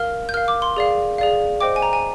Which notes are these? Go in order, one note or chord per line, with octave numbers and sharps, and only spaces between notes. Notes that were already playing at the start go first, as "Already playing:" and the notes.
Already playing: A#4 F5 F6
G6
A#4 F5 F6
D6
C6
G#4 D5 F5
G#4 D5 F5
C5 D#5 G5 D6
G#5
A#5
G#5